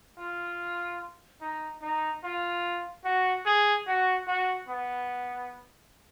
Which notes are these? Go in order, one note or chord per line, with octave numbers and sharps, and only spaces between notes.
F4
D#4
D#4
F4
F#4
G#4
F#4
F#4
B3